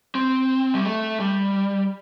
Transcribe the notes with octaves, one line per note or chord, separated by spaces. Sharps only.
C4
G3
A3
G3